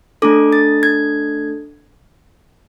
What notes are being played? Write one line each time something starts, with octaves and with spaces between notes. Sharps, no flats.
A3 D4 A4 D6
A6
G#6